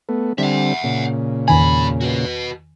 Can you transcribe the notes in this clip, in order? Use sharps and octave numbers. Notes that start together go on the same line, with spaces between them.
A3 B3
D3 G3 C4 E5 F#5
A#2 C#3
E2 G2 D#3 G#5 B5
F#4 B4